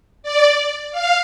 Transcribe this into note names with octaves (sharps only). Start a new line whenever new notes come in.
D5
F5